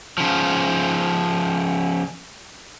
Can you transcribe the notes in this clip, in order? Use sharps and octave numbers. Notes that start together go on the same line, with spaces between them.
C#3 F3